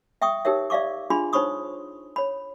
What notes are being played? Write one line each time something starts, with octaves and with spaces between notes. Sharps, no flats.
E5 G5 C#6 D#6
D#4 G4 A#4 C#5 E5
D5 E5 F5 C#6 D6
D4 F4 G#4 B5 C6
D#4 C5 C#5 B5 C#6 D#6
C#5 B5